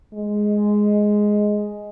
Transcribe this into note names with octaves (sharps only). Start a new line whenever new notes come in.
G#3